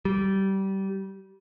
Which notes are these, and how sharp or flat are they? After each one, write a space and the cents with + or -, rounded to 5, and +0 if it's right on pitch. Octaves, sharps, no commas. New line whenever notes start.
G3 -20